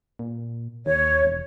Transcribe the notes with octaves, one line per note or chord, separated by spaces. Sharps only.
A#2
D#2 C#5
E1